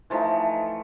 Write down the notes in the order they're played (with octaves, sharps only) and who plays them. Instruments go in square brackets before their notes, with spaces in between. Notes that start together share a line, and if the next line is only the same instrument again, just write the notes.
[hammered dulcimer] E3 F3 A3 D#4